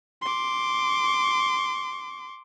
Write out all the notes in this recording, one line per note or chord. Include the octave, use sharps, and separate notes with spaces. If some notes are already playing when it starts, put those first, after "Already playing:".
C6 D6